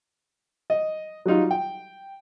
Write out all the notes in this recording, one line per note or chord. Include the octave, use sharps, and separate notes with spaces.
D#5
F#3 G3 D#4 F4
G5